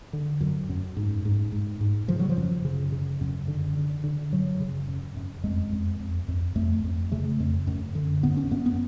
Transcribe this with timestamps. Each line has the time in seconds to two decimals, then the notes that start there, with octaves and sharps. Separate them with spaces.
0.13 D3
0.41 F#2
0.69 F#2
0.97 G#2
1.25 G#2
1.52 G#2
1.81 G#2
2.08 C#3 F3
2.19 F#3
2.29 F3
2.37 F#2
2.65 C#3
2.92 C#3
3.21 F#2
3.48 D3
3.77 D3
4.04 D3
4.32 F#2 F#3
4.60 C#3
4.88 F#2
5.16 F#2
5.43 F2 G#3
5.73 F2
6.01 F2
6.28 F2
6.55 F2 A3
6.84 F2
7.12 C#3 A3
7.40 F2
7.67 F#2
7.95 D3
8.23 F#2 B3
8.37 C#4
8.51 F#2 B3
8.66 B3